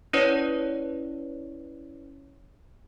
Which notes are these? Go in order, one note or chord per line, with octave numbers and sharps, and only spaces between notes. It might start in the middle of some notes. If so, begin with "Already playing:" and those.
C#4 E4 B4 C#5 D5